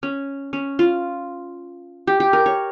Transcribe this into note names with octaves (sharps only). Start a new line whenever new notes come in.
C#4
C#4
F4
G4
G4
A#4
C#5